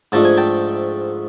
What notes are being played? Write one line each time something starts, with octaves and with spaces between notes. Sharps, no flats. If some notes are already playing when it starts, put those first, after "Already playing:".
G#2 F3 A3 D4 A5
G#5
G5 A5